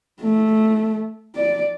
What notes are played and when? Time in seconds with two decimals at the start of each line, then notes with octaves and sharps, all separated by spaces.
0.21 A3
1.35 D5